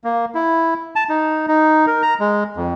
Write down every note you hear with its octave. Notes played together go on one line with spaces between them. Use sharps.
A#3
E4
A5
D#4
D#4
A#4
A#5
G#3
F2